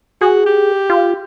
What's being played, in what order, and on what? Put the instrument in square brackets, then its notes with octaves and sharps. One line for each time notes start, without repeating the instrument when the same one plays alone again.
[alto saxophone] F#4 [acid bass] G#4
[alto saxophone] G4
[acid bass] F4